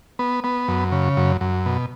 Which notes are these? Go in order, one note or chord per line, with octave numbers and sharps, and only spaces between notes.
B3
B3
F#2
C#3
F#2
F#2
B2